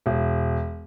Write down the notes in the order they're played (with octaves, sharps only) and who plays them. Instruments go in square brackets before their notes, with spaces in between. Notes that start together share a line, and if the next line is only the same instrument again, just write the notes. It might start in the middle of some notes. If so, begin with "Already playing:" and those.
[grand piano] E1